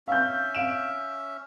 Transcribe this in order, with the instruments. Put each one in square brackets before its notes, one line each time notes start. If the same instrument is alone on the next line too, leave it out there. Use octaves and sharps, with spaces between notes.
[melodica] C#4 E5 [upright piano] F5 G6
[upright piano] F5 D7 E7